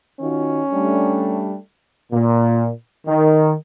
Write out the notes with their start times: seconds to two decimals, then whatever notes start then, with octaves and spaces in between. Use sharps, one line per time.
0.20 D#3 C#4 F4 F#4
0.72 G3 A3 D4
2.12 A#2
3.06 D#3